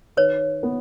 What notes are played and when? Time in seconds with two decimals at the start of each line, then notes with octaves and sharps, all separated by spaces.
0.17 D#3 B4 C#5
0.63 B3